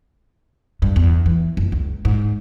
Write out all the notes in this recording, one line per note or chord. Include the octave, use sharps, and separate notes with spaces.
G2
E2
E3
F#1
C#2
G#2